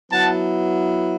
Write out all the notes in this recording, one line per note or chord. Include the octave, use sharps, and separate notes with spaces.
F#3 B3 E4 F#5 A5